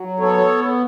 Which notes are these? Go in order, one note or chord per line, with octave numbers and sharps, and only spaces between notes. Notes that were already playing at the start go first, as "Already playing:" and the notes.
Already playing: F#3
B3 A4 C#5